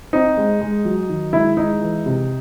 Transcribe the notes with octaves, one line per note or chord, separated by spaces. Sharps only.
C4 D#4
G#3
G#3
F#3
D#3
G#3 E4
G#3 D#4
E3
C3